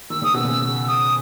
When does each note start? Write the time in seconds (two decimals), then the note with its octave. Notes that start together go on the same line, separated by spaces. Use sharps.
0.10 D#3 E6
0.22 C#3 D#6
0.34 B2 E6
0.45 C#3
0.61 E6
0.83 E6
0.87 D#6